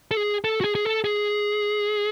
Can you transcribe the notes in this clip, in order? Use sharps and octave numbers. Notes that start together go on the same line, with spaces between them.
A4
G#4
A4
F#4
G#4
G#4
A4
G#4